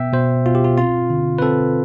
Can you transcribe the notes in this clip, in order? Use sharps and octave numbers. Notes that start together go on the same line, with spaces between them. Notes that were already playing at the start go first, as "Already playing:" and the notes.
Already playing: B2 B3 E5 G5
B2 C5
B2 F4
G4
F4
C4 F4
D3
B4
C4 A4